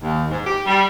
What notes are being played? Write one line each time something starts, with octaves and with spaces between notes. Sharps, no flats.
D#2
G#2
G4
G3